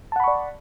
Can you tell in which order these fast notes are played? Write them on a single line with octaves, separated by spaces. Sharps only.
A5 F#5 B5 C#6 D5